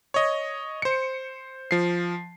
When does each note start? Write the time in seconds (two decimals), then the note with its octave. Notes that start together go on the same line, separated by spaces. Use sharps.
0.14 C#5 D#5
0.82 C5 C#7
1.71 F3 C7